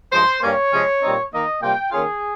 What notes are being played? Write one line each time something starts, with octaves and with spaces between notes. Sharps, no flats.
G2 F3 G#3 C5
G2 G3 A#3 C#4 C#5
C3 F3 G#3 C#4
A#2 G3 C4 D#4
D#3 A#3 D#4 D#5
C3 G3 A#3 F4 G5
D#3 A#3 C#4 F4 G#4